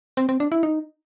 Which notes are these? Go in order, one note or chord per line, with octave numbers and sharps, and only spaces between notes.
C4
C4
D4
E4
D#4